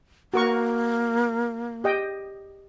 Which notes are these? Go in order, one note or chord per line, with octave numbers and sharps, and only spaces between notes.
A#3 F#4 A#4 C#6
G4 D#5 G5